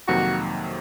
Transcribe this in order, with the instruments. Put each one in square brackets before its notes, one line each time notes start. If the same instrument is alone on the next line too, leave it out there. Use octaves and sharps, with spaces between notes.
[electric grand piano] F2 C3 D#3 F#3 A#3 [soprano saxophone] F#4